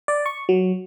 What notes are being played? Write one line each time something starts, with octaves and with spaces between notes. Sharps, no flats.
D5
C#6
F#3